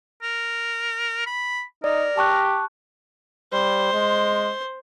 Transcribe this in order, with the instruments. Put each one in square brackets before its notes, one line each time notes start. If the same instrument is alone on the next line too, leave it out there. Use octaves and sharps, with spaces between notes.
[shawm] A#4
B5
[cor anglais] D#4 [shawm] A#4 [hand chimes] D5
[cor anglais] G4 [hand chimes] A5 C#6 F#6
[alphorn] G3 [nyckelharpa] C5
[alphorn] G#3